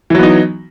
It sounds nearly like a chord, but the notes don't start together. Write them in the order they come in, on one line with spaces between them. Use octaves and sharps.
E3 F#3 B3 D#4